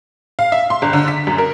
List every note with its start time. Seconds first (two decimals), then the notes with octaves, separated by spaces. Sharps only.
0.39 F5
0.52 E5
0.70 C6
0.82 G1
0.93 D3
1.08 B6
1.27 F#2
1.38 A#4